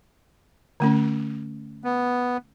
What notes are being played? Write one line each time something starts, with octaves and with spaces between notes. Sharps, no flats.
D3 A3 C#4
B3